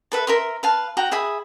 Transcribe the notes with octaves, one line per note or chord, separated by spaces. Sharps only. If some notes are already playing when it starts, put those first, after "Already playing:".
A4 B4 E5
A#4 E5 C6
B4 F5 A5
F#4 G5 A#5
G#4 E5 B5 D#6